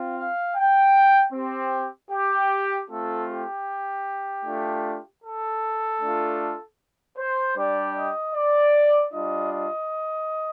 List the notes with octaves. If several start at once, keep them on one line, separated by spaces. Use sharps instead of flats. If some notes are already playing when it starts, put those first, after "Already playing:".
Already playing: C4 F4
F5
G5
C4 G4
G4
A3 C4 F4 A4
G4
A3 D4 F4
A4
A3 D4 F4
C5
G3 D4 G4 D5
D#5
D5
G3 D4 F4 D#5
D#5